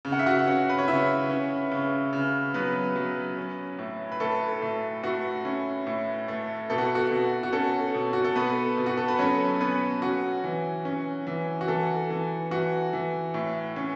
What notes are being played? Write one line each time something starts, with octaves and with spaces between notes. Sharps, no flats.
C#3
F#5
E5
F#4 F#5
C#4
B4
C#5
C#3 E4 E5
C#4
C#3
C#3
F#3 B3 B4
F#3
C#4
A2
B4
A2 A4
A2
A3 F#4
C#4
A2
A3
B2 A4
F#4
F#4
B2
F#4
C#4 A4
B2
F#4
A4
B2 B3 B4
B2
F#4
A4
B4
F#3 C#4 C#5
B3 C#4 B4
C#4 F#4
E3
C#4
E3
F#4
E3 A4
E3
E3 F#4
E3
A2
C#4